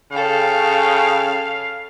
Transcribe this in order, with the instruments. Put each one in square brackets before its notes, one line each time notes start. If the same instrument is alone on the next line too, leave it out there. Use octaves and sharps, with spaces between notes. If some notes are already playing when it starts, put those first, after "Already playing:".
[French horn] C#3 [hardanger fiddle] A4 G5 [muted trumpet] F5